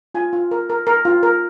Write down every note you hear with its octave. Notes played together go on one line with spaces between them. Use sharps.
F4 G#5
F4
A#4
A#4
A#4
F4
A#4